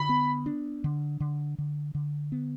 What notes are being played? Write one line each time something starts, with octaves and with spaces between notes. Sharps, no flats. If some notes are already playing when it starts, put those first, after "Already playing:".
Already playing: D3 B5
B3
D4
D3
D3
D3
D3
B3